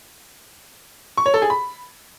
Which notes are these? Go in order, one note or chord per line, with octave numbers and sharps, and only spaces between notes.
C#6
C#5
A4
G#4
B5